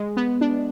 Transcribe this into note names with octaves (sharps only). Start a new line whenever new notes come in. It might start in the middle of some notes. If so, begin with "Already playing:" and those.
Already playing: G#3
B3
D4